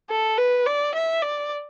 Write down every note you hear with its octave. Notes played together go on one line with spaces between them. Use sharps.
A4
B4
D5
E5
D5